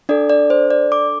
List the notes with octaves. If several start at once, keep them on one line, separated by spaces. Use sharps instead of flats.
D4 A4 D5
D5
C5
D5
D6